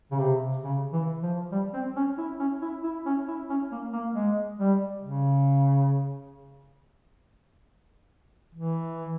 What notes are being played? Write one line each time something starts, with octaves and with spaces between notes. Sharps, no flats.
C#3
C3
C#3
E3
F3
G3
C4
C#4
E4
C#4
E4
E4
C#4
E4
C#4
A#3
A#3
G#3
G3
C#3
E3